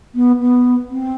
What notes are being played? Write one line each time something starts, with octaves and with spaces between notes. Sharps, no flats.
B3
B3
C4